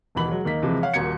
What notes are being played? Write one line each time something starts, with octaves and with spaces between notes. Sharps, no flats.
D#1 D#2 B2 E3 B5 F#7
F#3 G#3
D#2 A#3 D#4 B6
C3 E3 F3 G#3
C#5 F5 F#5
D#1 A#3 F#4 G#6 C#7